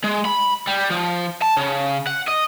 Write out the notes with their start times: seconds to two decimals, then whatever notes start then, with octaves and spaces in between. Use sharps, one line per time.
0.04 G#3
0.25 B5
0.68 G3
0.90 F3
1.42 A5
1.57 C#3
2.07 F#5
2.28 D#5